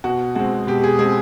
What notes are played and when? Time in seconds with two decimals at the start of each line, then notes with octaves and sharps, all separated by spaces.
0.04 B2 F#4
0.35 G#3 C4 F#4
0.67 B2 G4
0.84 G#4
0.99 G#3 C4 G#4